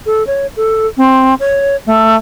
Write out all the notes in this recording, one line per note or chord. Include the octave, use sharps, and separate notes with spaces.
A4
C#5
A4
C4
C#5
A3